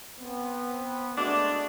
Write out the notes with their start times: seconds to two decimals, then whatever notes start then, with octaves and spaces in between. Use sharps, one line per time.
0.19 B3 C4
1.17 G#3 A3 D4 F#4